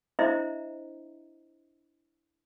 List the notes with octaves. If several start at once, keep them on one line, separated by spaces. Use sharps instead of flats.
D4 E4 C5 D#5 E5 A#5